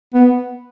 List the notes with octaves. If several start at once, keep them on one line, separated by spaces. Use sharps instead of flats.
B3